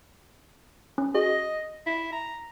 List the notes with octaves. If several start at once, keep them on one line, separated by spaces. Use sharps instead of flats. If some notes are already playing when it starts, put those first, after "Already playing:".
C#4
F#4 G#4 D#5
E4
A#5